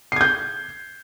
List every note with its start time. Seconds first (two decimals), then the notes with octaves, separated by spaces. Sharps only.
0.12 C7
0.16 G#6
0.21 G6